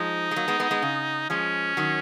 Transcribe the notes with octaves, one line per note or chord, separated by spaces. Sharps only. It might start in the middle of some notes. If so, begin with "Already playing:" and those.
Already playing: F3 G#3 D#4
G#3
F#3 A#3
G#3 B3
G#3 B3
G#3 B3
C#3
F3 G#3 C#4
D#3 F#3